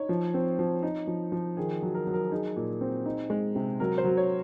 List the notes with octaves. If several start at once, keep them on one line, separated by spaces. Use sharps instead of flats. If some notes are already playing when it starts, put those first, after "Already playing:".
Already playing: D#4 C#5
F3
C4
F3
D#4
F3
F3
D#3 G#4
F#3
A#4
F#3
A#4
D#4 G#4
A#2
C4
D#4
G#3
C3
F#3 A#4
C5
F#3
C#5